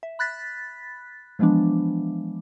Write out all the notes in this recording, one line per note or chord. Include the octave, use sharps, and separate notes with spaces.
E5
B5 F#6 A6 B6
E3 F3 G#3 B3 D4